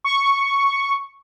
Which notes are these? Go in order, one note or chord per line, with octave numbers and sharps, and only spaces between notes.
C#6